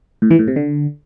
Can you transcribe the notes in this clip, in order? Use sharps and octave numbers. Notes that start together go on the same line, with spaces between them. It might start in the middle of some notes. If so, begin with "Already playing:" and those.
A2
E3
A2
C3
D3